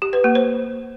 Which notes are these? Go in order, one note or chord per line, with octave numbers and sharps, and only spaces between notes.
G4
B4
A#3
C5